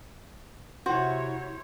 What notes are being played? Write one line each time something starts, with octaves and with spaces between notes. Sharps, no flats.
C3 E4 F#4 C5 C#5